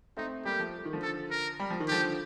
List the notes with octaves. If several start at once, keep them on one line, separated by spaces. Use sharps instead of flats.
A3 C4 D#4
G3 A#3 G4
F3 A3
D#3
D3 F3
A4
A#4
G3
F3
D#3
D3 F3 G4